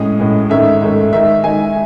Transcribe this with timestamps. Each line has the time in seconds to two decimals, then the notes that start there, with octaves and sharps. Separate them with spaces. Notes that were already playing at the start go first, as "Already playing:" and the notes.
Already playing: A2 G#3 C#4 D#6
0.19 A2 G#3 C#4
0.50 G#2 D#3 A3 C#4 E5
0.82 G#2 D#3 A3 C#4
1.13 D#3 G#3 D#4 E5
1.43 D#3 G#3 D#4 G#5